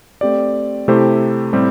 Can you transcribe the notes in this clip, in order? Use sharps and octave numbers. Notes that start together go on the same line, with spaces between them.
A3 C4 G4 D5
C3 A3 E4 G4 C5
A2 G3 C4 G4